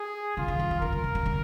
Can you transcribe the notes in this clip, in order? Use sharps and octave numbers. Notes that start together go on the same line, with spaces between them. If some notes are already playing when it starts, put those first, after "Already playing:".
Already playing: G#4
D3 F4
D#3
D#3
D#3
D#3 A#4
D3
D#3
D#3
D3